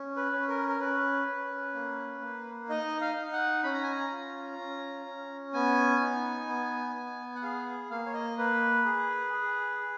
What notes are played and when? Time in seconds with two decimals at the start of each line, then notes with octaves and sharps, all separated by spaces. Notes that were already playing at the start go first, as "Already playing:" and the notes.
Already playing: C#4
0.17 B4
0.32 C#4
0.49 A#4
0.68 A#4
0.80 C#4 B4
1.27 C#4
1.74 A#3
2.22 A#3
2.69 D#4 D#5
3.01 F5
3.17 D#4
3.32 F#5
3.63 C#4 B5
3.73 A#5
3.83 G#5
3.91 A#5
4.11 F4
4.59 C#4
5.06 C#4
5.53 B3 G#5
6.01 D#4
6.48 B3
6.95 B3
7.35 F#5
7.43 G#4 F5
7.91 A#3 F5
8.06 C#5
8.14 D#5
8.38 A#3 B4
8.85 G#4
9.32 G#4
9.80 G#4